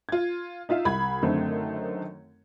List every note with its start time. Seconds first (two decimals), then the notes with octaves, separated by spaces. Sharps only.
0.09 F4 G#6
0.69 D#4 F4 E5 F5
0.85 C2 B5 G#6
1.22 F#2 D3 D#3 A3 C4 D#4